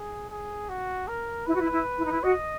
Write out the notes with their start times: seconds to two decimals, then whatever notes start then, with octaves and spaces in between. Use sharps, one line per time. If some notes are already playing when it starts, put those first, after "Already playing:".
Already playing: G#4
0.31 G#4
0.69 F#4
1.08 A#4
1.46 E4 B4
1.54 F#4
1.61 E4
1.72 E4
1.99 E4
2.05 D#4
2.12 E4
2.23 F#4 D#5